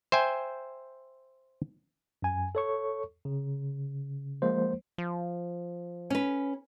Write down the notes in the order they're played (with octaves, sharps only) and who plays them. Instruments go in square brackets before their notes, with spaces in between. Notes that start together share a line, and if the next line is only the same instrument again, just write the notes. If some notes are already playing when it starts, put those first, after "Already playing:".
[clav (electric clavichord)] C5 E5 G5 G#5
[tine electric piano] F#2 G#5
A4 C#5 C#6
C#3
F3 G#3 A#3 C5
[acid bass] F3
[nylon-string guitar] C#4 B4